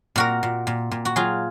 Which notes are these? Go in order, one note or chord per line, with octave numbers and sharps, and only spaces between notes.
A#2 F#4 A#4
A#2
A#2
A#2
F#4
F#3 F4 G#4